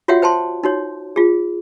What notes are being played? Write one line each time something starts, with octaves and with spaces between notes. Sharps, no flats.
F4 F#4 C#5 E5 F#5 G5
C5 G5 A5 C6
D#4 F#4 C#5
F4 G#4